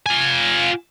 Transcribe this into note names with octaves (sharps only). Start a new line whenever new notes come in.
F4 G#5